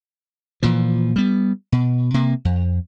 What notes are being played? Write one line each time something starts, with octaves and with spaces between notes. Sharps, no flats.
A#2 E3 F3
G3 B3
B2
C3 A#3
F2